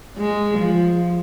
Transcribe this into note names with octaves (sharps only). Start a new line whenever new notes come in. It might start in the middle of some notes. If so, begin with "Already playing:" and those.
G#3
F3